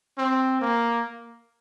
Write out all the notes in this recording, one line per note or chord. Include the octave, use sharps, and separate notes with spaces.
C4
A#3